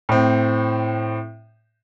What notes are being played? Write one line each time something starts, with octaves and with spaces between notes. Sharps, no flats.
A2 C4